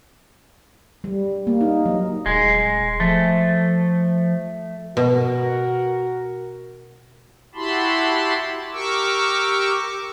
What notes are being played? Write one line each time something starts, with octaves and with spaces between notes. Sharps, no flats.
G3
A#3
D#4
F#3
D#1 G#3
F3 A3
B2 F#4 A#4
E4 F#4 G4 A5 B5 C6
G4 A#4 C#6 D6 E6